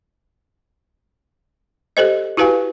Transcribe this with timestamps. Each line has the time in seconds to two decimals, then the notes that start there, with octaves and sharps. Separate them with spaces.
1.97 G4 A4 C5 D#5
2.37 E4 F#4 G4 B4 F5 G#5